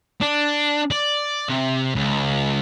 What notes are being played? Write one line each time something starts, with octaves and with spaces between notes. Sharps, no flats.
D4
D5
C3
C#2